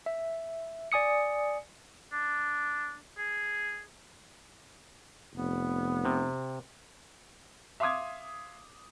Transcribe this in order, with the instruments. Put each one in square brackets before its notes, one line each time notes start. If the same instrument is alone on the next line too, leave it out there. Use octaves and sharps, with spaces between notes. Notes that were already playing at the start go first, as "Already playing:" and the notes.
[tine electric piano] E5
D5 G#5 D#6 C#7
[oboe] D4
G#4
[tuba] F1 [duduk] B3
[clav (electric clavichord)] C3
[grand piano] E5 F5 C6 D6 D#6 G#6